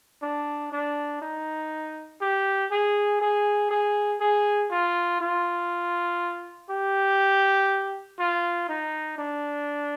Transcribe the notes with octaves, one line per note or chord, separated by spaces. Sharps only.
D4
D4
D#4
G4
G#4
G#4
G#4
G#4
F4
F4
G4
F4
D#4
D4